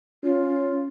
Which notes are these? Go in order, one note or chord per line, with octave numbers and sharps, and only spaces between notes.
C#4 F4